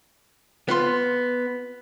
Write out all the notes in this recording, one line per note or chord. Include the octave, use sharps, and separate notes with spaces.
B3 F4 C6